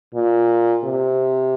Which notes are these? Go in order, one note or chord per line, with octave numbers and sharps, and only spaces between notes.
A#2
C3